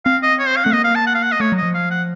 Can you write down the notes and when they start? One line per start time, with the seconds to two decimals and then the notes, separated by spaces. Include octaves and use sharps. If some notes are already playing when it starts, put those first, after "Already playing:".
0.06 C4 F5
0.23 D#5
0.40 C#5
0.48 C5
0.56 F5
0.64 A3 F#5
0.73 A#3 D#5
0.84 F5
0.95 A5
1.07 F#5
1.15 F5
1.23 F#5
1.32 D#5
1.40 A3 C#5
1.52 F#3
1.57 D#5
1.63 F3
1.74 F5
1.91 F#5